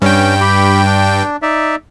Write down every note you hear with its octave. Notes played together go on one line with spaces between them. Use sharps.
G2 C#4 G5
G4 B5
D4
D#4 D5 E5